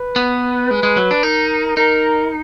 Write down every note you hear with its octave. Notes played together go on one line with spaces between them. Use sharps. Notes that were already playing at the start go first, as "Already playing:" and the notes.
Already playing: B4
B3
G#3
G#3
F#3
D4
D#4 A#4
D#4 A#4